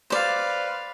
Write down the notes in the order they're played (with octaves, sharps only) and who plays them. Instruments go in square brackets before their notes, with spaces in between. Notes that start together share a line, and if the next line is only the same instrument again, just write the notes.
[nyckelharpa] B4 F5 [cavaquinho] C5 D5